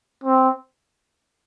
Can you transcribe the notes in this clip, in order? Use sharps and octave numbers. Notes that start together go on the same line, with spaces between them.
C4